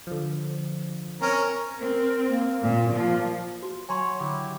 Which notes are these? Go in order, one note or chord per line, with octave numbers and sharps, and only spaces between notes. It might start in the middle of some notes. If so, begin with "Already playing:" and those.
D3 F3
C4 C#4 A#4
C4 A#4
A#3
A#2
F3 A#3
F#4
F#3 C#5 G#5 A#5 C6
D3 E4 G4